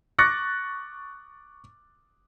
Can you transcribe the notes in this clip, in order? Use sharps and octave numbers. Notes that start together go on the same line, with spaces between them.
C#6 D6 F#6 A6 A#6 C#7